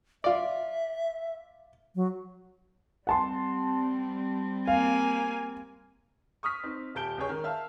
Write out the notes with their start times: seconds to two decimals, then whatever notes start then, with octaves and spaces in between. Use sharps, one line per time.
0.24 F4 D5 E5
1.95 F#3
3.07 G3 C4 F#5 A5 C6
4.68 A#3 F5 G#5
6.43 C#6 D#6 F6 B6
6.63 C4 D#4
6.95 D#1 G4 A5 G6 D7 G7
7.18 C#2 G#4 C#5
7.29 D#3
7.44 E5 F5 A5 F6